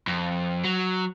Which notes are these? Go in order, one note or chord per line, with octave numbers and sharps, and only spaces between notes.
F2
F#3